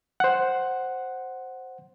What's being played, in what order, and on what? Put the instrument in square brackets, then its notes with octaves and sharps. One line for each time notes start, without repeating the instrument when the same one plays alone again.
[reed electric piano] C5 F#5